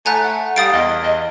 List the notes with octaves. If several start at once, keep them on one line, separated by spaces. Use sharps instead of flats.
A3 F#5 G#5 A#5 F#6
F#5
G3 F5 D#6 A6 D7
E2 D#5
D#5